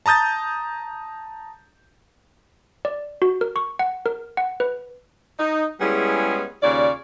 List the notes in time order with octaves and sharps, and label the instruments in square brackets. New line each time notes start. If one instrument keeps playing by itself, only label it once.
[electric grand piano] A5 A#5 D#6 G6 A6
[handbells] D5
F#4
A#4
C#6
F#5
A#4
F#5
B4
[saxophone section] D#4
G3 G#3 B3 C#4 E4 G#4
D#2 C#3 F4 C#5 D5